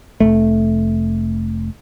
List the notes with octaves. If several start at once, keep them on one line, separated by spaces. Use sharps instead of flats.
F1 E2 A3